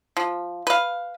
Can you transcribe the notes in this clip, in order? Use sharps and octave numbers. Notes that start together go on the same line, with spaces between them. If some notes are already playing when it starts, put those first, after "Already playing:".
F3
B4 F5